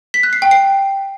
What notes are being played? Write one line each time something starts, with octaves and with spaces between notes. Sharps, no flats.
B6
F#6
C7
G5
C7